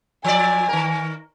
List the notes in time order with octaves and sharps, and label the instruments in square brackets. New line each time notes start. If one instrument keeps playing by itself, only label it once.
[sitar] F3 D5 [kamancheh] G#5
[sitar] D#3 A#4